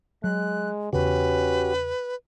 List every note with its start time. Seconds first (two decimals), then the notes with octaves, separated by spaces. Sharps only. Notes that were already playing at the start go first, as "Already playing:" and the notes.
0.24 F#3 G#3 F#6
0.93 E2 C#3 C#4 F#4 G4 B4